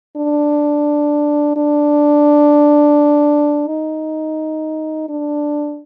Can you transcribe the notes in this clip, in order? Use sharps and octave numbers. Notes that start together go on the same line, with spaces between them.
D4
D4
D#4
D4